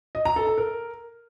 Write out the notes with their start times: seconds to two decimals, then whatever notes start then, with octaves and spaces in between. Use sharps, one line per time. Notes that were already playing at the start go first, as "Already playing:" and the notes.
0.15 D#5
0.25 A#5
0.36 A4
0.47 A4
0.58 A#4